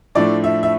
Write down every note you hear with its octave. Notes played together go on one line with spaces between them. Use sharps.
A2 F3 A3 D4 D5
E5
E5